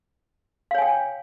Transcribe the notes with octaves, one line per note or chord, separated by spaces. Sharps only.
C#5 F5 G5 G#5